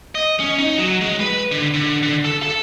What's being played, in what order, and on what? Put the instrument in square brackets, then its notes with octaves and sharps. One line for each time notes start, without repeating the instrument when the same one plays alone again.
[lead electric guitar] D#5
C#4
D#4
F#3
G#3
B4
D3
D3
D3
A4
A4